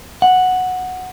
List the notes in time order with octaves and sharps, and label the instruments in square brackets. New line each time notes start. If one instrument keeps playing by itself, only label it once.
[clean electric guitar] F#5